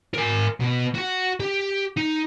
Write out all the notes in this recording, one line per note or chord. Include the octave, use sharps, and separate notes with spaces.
A#4 G#5
B2 B3
F#4 F#5
G4
D#4